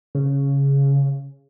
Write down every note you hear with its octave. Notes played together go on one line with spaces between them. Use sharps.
C#3